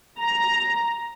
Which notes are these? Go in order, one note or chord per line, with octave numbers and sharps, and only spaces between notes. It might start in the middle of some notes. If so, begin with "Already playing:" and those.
A#5